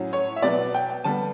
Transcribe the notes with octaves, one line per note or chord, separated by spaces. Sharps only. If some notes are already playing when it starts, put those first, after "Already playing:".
Already playing: A2 F#3 C#4
C#5
E5
B2 F#3 B3 D5
G5
D3 G3 B3 A5